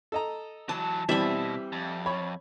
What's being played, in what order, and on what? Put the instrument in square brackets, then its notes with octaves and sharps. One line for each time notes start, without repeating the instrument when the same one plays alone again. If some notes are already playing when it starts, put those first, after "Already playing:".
[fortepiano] A4 D#5 A#5
[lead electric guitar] E3 F#3 [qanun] A5
[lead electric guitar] B2 [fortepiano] E3 G3 C4 [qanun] E5 B5
[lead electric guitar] F2
[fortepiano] C#5 B5